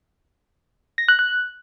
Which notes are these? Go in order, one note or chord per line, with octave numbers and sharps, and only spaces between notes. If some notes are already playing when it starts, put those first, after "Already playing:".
A#6
F#6
F#6